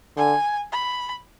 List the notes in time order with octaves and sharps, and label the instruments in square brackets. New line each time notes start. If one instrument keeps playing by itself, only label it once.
[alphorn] D3 [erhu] G#5
[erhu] B5